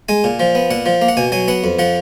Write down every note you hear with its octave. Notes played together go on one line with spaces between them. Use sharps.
G#3 G#5
A#2
F3
B3
A#2 F#5
F3
A#3
F#5
B2 G#5
F#3 G#5
B3 F#5
F2
F3 F#5